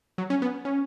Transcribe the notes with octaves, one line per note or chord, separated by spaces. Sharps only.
F#3
C#4
B3
C#4